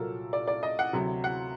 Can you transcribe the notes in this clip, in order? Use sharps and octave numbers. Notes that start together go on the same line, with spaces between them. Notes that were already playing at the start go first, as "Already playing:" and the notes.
Already playing: C2 A#2 F#3 A4 A#4
D5
D5
D#5
F#5
D2 C3 F#3
F#5